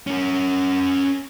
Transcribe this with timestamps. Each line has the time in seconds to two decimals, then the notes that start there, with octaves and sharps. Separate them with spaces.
0.07 C#4 A#4